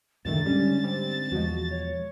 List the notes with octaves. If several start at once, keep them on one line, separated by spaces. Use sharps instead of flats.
C#2 F#2 A2 D3 D#3 A3 A6
G#2 D3 G3 C#4
G3 C4
E2 B2 E3 F3 G#3 F#4
C#5